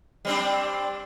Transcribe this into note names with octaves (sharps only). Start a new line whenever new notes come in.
G3 C4 D4